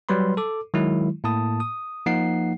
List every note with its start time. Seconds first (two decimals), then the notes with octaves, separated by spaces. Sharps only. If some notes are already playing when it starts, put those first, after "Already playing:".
0.09 F#3 G3 B4 B5 C6
0.37 A4 D6
0.74 D#3 F#3 G#3 E4
1.24 A2 A#3 A5 D#6
1.60 D#6
2.06 F3 A#3 D#4 F#5 C7